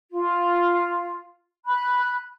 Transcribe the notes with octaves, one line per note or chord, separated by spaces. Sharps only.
F4
B5 F#6